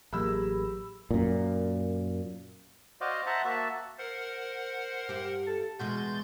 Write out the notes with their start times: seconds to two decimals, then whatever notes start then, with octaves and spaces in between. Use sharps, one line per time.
0.13 A1 F#3 A#3 G4 G#4 A#4 B5 E6
1.11 F#2 A#2
3.01 F#4 C5 D5 D#5 F5
3.27 C5 E5 F#5 A5 A#5 F#6
3.45 A#3 F#4 E5 A5
3.99 A#4 C5 F#5
5.09 G2 G4
5.47 A4
5.79 E2 B2 G#3 F#4 C6 G6 A6